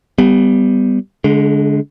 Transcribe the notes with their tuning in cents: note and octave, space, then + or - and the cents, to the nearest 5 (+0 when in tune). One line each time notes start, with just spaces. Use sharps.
G3 +0 B3 +20
D3 -25 G#3 +20